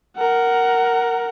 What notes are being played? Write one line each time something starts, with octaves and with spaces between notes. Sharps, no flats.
A#4 F#5